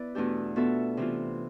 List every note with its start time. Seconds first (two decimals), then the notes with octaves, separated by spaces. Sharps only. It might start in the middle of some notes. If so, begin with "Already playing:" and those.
Already playing: B3 E4 B4 D5
0.15 E2 B2 A3 D4 G4
0.56 B2 B3 F4 A4 E5
0.97 C3 E3 B3 F4